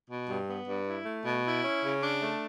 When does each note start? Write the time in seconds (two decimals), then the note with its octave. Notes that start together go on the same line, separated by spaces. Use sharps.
0.08 B2
0.28 G2
0.47 B3
0.66 G2
0.86 E4
1.05 A3
1.24 B2
1.44 E4
1.63 C#4
1.82 C#3
2.02 D4
2.21 A3